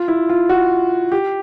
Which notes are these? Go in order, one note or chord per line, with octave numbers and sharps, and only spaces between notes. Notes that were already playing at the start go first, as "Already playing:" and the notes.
Already playing: F4
E4
F4
F#4
G4